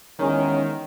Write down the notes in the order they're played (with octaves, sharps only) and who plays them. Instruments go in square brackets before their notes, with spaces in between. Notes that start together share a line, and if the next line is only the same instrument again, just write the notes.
[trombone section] E2 G#3 C#4 [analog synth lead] D#3